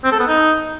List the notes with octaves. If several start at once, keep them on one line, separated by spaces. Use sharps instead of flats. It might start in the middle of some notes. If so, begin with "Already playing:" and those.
C4
A4
B3
D#4